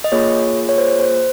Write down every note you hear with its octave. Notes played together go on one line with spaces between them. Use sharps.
D#5
A#3 F4 G#4 C#5
C#5
C5
C5